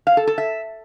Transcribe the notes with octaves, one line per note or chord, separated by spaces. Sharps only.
F5
A4
A4
E5